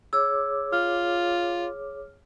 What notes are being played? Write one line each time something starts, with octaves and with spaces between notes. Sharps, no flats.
G#4 C#5 D6 E6
F4 F6